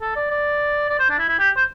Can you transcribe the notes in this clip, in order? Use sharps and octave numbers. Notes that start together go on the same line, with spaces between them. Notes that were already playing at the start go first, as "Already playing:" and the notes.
A4
D5
D5
D5
C5
D4
E4
E4
G4
C5